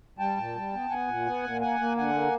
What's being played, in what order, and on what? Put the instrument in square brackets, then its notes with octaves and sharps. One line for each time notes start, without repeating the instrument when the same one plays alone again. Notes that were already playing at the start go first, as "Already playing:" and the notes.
[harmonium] G3 G5 A5
A#2
G3
B3
B3 F#5 G#5
A#2
B3
A#2
A#3 F#5 G#5
A#3
D3 F#5 G#5
A#3